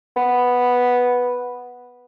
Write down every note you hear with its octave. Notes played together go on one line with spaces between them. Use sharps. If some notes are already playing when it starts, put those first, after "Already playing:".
B3